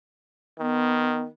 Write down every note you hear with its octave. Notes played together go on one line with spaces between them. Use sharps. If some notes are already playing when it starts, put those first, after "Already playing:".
D#3 B3